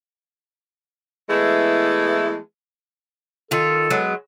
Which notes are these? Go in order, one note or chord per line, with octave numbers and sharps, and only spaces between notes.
E3 G#3 A3 B3 E4
D#3 F4 A4
F#3 G#3 B3